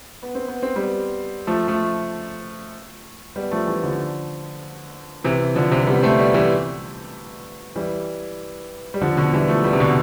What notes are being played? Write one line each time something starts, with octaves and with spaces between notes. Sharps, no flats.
B3
C4
B3
C4
G3 B3
F3 A3
F3 A3
G3 B3
F3 A3
E3 G3
D3 F3
C3 E3
D3 F3
C3 E3
G3 B3
A3 C4
G3 B3
E3 G3
E3 G3
G3
D3 F3
B2 D3
E3 G3
F3 A3
G3 B3
C3
B2 D3